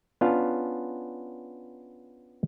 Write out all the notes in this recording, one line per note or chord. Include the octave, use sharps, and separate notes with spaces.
B3 C#4 D4 F4 F5